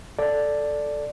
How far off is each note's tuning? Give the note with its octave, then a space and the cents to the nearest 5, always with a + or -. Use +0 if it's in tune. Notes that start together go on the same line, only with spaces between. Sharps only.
A4 +0 D5 +0